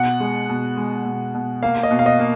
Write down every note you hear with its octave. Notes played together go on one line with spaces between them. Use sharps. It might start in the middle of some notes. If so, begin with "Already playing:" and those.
Already playing: B2 F#5
G#3
B2
G#3
B2
B2
A#3 F5
D#5
B2
F5
D#5
A#3